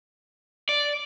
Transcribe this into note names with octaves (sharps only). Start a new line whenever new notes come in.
D5